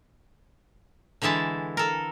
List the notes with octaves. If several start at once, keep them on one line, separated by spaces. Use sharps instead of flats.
D3 E3 G#3 E4 A5
A4 A#4